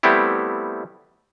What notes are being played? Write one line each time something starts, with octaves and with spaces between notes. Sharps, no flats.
G3 A3 B3 C4 E4 G4